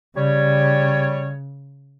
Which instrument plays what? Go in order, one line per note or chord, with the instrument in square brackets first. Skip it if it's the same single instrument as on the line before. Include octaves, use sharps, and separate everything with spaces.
[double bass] C#3 [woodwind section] G3 C#5